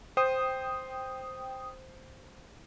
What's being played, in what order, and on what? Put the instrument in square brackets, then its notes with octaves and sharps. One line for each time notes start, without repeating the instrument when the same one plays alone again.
[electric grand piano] C5 [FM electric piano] G5 D#6